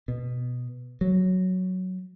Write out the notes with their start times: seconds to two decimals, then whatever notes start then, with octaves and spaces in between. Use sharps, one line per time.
0.08 B2
1.01 F#3